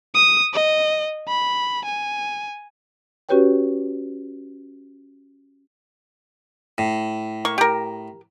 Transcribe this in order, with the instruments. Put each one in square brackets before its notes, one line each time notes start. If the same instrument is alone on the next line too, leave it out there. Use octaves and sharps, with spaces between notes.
[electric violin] D#6
D#5
B5
G#5
[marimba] C#4 F#4 G4 B4 C#5 G5
[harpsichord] A2
[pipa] A#3 C#6
G4 A#4